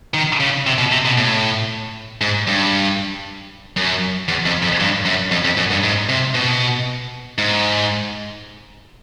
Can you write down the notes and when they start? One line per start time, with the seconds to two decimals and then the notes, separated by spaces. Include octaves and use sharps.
0.14 D#3
0.40 C#3
0.67 C3
0.79 B2
0.92 C3
1.05 B2
1.18 A2
2.21 G#2
2.47 G2
3.76 F#2
4.28 E2
4.46 F2
4.62 F2
4.80 G2
5.05 F#2
5.31 F2
5.45 F2
5.57 F#2
5.71 G2
5.84 G#2
6.09 C3
6.35 B2
7.38 G#2